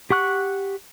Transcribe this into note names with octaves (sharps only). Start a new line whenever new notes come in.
G4 F#5 C#6 F#6